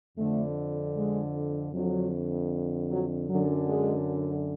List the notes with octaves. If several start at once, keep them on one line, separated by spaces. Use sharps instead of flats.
F2 D3 A3
G#3
F2 D3 F#3
F#3
F#2 D3 F#3
G#3